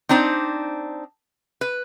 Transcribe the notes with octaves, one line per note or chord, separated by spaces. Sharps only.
C4 D4 D#4 C5 D5
B4